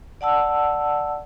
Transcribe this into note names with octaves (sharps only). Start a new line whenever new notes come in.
D5 F#5 A5 E6